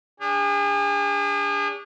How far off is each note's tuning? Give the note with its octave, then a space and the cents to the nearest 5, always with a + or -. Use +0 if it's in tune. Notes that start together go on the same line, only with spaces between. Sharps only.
D4 -25 G#4 -40